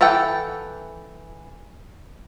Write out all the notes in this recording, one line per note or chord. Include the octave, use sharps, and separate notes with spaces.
E3 A4 F#5 G5